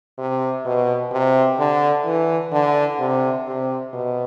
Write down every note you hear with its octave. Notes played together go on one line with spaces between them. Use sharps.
C3
B2
C3
D3
E3
D3
C3
C3
B2